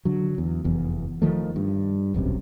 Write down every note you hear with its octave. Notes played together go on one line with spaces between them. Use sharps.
D3 F#3
E2
F1 E2
D#3 F3 A3
G2
E1 B1 F#2 C3